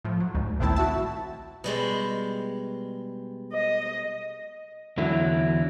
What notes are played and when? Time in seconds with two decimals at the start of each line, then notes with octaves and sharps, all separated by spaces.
0.04 A2 F3
0.20 F#3
0.35 D2 G#2
0.59 A#1 A2 D#3 C4 E4 A5
0.76 E4 F#4 E5 A5
1.64 B2 G3 G#3
3.53 D#5
4.97 E2 D3 F#3 E4